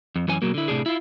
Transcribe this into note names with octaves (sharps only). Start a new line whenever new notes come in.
F2
F#2 E3 C#4 G#5
B2 F#3 A#3
D3 E4
A2 C3 D4 G#4
E4 F4